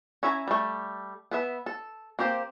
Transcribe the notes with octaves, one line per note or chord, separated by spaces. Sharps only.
C#4 E4 E5 G#5 A#5
G3 A3
B3 B4 E5
A4
A#3 C4 G4 C5